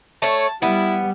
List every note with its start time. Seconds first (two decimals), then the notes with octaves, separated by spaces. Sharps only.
0.22 A3 C#5 A5
0.62 G3 B3 E4